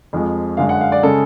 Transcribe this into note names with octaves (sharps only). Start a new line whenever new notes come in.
F2 F3 G#3
F#2 D3 G#3 F5
F#5
F5
D5
C#3 G#3 A4